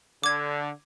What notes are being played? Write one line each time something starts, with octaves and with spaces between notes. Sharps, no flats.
D3 D6 G#6